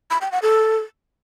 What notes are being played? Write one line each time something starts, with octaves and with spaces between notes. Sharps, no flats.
B5
G5
F#5
A4